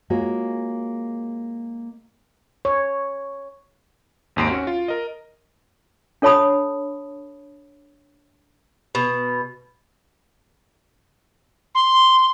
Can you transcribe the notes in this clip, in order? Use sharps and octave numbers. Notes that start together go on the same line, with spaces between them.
G#3 A#3 F4 F#4 G#4 C#5
C#5
G#1 D#2 C6 D7
C#4 F#4
F4
A#4 D#5
D4 A4 C#5 A5 B5 D#6
B2
C6